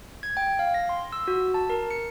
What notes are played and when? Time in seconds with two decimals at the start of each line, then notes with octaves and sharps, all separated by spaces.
0.23 G#6
0.37 G5
0.59 F5
0.74 A#6
0.89 C6
1.13 E6
1.28 F#4
1.54 A5
1.70 A#4
1.91 C#7